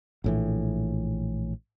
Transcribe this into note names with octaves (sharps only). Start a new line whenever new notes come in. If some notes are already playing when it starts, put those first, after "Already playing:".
A#1 A2 E3